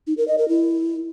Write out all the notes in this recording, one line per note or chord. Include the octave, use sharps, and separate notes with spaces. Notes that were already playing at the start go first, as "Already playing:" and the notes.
D#4
A#4
D#5
A#4
E4